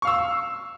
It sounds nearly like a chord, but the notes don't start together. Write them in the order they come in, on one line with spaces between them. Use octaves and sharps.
C#6 F5 E6